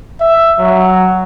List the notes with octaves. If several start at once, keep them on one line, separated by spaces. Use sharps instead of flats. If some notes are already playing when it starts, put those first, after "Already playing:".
E5
F#3